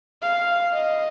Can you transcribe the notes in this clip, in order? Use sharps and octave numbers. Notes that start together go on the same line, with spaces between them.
F5
D#5